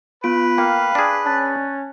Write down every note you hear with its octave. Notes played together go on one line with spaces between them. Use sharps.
B3 F4 B4 D7
A#3 F5 G5
D4 G#4
C#4 A5 F#6 A6